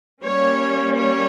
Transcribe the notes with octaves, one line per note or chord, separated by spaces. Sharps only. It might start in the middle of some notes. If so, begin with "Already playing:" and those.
G3 A#3 C#4 C#5
C#5